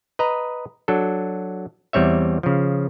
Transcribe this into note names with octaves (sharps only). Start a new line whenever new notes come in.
B4 D#5 A#5
F#3 D4 A4
E2 G3 C4 C#5 E5
C#3 F3